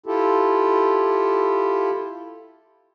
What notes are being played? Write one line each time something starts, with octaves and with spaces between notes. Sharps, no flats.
E4 F4 G4 A4